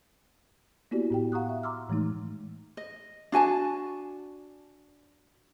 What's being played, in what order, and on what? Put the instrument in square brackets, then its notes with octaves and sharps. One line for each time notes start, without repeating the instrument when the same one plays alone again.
[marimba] A#3 B3 E4 F#4 G4 D5
A2 G4 G5
F5 F#5 A#5 C#6 D#6 F#6
E5
A#5 C6 D6 E6 F6
A2 E3 G#3 A3 D#4
[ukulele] D#5
D4 F#4 G#5 A5